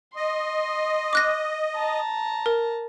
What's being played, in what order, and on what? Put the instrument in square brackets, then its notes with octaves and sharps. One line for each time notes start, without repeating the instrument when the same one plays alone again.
[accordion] D#5 [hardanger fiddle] C6
[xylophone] D6 F#6 A#6
[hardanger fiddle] A5 A#5
[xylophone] A#4